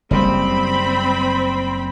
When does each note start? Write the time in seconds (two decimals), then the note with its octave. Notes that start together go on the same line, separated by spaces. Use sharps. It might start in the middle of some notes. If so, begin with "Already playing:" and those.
0.11 F#1 C#3 G3 C4 B5